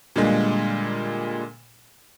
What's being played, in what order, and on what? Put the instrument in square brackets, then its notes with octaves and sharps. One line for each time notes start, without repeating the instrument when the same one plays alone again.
[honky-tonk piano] A#2 D3 G3 G#3 A#3